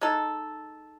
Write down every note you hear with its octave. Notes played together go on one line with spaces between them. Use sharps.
G#3 D#4 A4